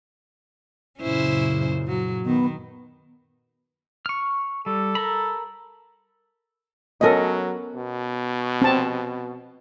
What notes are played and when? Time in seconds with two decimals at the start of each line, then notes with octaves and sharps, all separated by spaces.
0.99 F#2 A#2 C#3 C#4 E4 C5
1.87 F#3
2.25 D#3 B3
4.06 C#6 F6
4.66 G3 A4
4.95 A#4 A#5 B5
7.01 F#3 B3 C#4 A4 A#4 D#5
7.75 B2
8.62 C4 A5